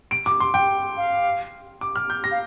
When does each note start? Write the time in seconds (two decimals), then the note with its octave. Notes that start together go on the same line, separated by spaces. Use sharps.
0.11 D7
0.26 D6
0.40 C6
0.54 G5
0.97 F5
1.81 D6
1.96 F6
2.10 G6
2.24 A#6
2.31 F5